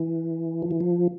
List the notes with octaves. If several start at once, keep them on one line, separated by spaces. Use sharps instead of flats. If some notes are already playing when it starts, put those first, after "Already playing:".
Already playing: E3
F3
E3
F3